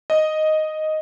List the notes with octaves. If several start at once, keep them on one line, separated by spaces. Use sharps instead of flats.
D#5